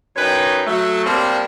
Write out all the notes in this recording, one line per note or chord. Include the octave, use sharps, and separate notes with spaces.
F#2 D#4 B4 C#5 G5
F#3 A3
F3 G3 A#3 C4 D4